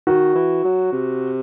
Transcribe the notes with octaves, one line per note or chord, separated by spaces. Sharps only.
D#3 F#4
E3
F#3
C3